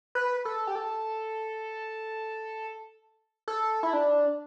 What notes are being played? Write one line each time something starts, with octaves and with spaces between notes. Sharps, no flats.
B4
A4
G4
A4
A4
E4
D4